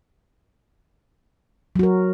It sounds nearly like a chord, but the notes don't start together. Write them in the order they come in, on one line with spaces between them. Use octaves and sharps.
F#3 F#4 A#4